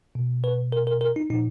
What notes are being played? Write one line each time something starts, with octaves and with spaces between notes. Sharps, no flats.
B2
B4
A#4
A#4
A#4
D#4
A#2 F3 D#4